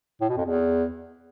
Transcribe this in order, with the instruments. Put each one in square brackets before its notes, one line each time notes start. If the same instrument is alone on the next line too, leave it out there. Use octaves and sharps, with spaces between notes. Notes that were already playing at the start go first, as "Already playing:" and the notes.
[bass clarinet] A2
B2
F2
E2